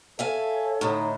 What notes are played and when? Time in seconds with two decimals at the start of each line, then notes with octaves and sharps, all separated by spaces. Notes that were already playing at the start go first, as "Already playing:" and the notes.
0.19 A4 C#5 E5 F5 G#5
0.81 A2 D3 D#4